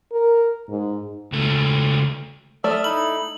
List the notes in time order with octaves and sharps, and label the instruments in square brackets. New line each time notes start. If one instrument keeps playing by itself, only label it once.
[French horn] A#4
G#2
[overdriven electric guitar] C#2 A3
[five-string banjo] A3 D5 [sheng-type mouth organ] E5 D#6 F6
[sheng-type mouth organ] D#4 E4 [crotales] F#7